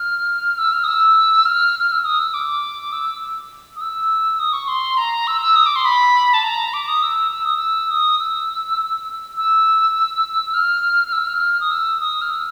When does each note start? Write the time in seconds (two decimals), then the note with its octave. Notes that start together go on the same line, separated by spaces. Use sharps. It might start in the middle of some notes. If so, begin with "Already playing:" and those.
Already playing: F6
0.58 E6
0.73 F6
0.84 D#6
0.88 E6
1.46 F6
1.79 F6
1.92 E6
2.05 D#6
2.19 E6
2.34 D6
2.93 E6
3.76 D#6
3.81 E6
4.39 D#6
4.53 C#6
4.68 C6
4.97 A#5
5.27 E6
5.41 E6
5.56 D#6
5.66 D6
5.76 C6
5.85 B5
6.34 A5
6.44 A#5
6.73 D6
6.88 D#6
7.03 E6
7.31 E6
7.45 D#6
7.57 E6
7.91 D#6
8.19 E6
9.37 E6
10.54 F6
11.08 F6
11.13 E6
11.27 F6
11.60 D#6
11.71 E6
12.00 D#6
12.21 F6
12.30 E6